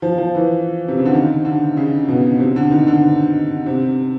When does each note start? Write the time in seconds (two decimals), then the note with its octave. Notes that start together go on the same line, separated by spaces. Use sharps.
0.02 F3
0.18 F3
0.35 E3
0.88 C3
0.97 C#3
1.05 D3
1.13 D#3
1.45 D3
1.77 C#3
2.08 B2
2.39 C3
2.56 D3
2.71 D#3
2.87 D3
3.66 C3